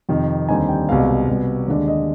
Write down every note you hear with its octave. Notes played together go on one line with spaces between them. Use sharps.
F2 C3 D#3
D#2 D3 G3 C4 D#4 G#5
G5
C2 B2 G#3 B3 F5
C2 B2 G3 B3
D#2 D3 G#3 D4 D5
D#5